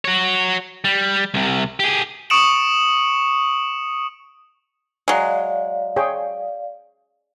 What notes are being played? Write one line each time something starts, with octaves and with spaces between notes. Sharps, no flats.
F#4 C#5
G3
C2 C3
G4 G#4
C#6 D#6 C#7 D7 E7 F#7
F#3 G#3 D5 F5
G#4 C#5 G5